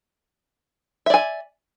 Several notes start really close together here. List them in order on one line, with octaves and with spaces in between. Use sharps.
E5 D5 G#5